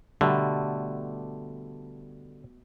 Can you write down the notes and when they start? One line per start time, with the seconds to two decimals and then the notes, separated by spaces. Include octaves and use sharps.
0.21 B2 D3 G3 A3